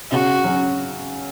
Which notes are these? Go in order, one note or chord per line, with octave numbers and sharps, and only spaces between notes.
C#3 F#4
F#3 C#4